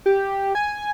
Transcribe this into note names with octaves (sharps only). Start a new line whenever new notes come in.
G4
G#5